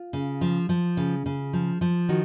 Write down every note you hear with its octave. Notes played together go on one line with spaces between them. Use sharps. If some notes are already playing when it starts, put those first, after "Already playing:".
Already playing: F4
C#3
F3
F3
C#3
C#3
F3
F3
D#3 F#4